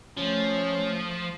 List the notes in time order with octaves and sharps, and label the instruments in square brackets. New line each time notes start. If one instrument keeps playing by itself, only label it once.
[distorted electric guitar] F3 [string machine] A3 [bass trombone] C#4